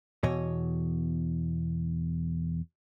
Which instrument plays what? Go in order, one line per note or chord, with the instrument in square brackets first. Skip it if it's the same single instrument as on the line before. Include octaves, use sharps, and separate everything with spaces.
[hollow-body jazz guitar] E2 B2 C#5 D#5